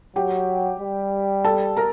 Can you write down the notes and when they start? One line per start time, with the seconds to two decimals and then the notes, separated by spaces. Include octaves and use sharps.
0.16 F#3 G4 G5
0.81 G3
1.45 A4 A5
1.77 A#4 A#5